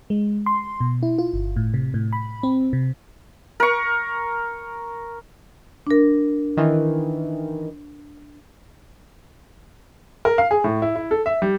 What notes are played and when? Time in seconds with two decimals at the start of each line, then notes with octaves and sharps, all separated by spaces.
0.10 G#3
0.46 C6
0.80 B2
1.03 E4
1.18 F4
1.33 G1
1.56 A2
1.74 C3
1.94 A2
2.13 B5
2.43 C4
2.73 C3
3.60 A#4 C#6
5.87 D4 A#4
6.57 D#3 E3
10.25 A#4
10.38 F5
10.51 G#4
10.64 A2
10.82 E4
10.96 E4
11.11 A4
11.26 E5
11.42 G3